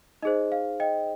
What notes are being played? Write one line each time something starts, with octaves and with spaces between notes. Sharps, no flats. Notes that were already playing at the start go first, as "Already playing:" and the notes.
D#4 G#4 C5 D#5
F5
D#5 G5